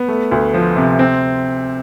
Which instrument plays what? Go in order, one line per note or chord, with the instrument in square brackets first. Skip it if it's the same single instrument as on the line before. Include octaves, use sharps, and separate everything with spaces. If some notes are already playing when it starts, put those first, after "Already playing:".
Already playing: [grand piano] B3
A3
D2
F3
C3
C4